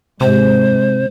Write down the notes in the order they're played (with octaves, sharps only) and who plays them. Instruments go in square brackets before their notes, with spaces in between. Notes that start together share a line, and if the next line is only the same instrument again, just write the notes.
[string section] G#2 [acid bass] C3 [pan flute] C5